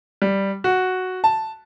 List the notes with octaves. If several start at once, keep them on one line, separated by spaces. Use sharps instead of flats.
G3
F#4
A5